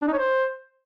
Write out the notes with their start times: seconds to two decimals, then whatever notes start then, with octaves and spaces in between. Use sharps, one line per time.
0.02 D4
0.08 D#4
0.13 C#5
0.19 C5